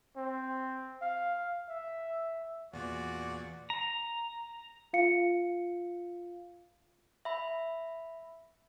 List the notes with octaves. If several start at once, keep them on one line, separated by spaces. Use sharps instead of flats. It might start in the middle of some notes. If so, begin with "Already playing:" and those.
C4
F5
E5
E2 A#2 F#4 D5
A#5
F4 F5 C#7
E5 B5